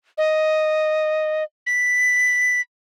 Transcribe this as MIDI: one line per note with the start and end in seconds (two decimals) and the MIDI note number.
0.18 1.43 75
1.67 2.61 95